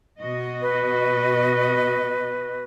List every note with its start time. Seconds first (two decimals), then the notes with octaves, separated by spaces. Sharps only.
0.19 B2 F#4 D#5
0.62 B4